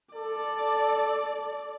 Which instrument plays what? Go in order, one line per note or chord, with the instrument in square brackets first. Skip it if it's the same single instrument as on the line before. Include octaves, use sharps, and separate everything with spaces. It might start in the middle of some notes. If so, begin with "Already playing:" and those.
[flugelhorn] A4 [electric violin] D5